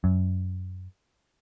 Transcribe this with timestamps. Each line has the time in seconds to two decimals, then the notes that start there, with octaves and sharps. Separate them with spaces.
0.04 F#2